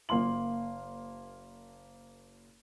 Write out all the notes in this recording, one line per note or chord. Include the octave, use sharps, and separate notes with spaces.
F#1 A#3 F5 C6 F#7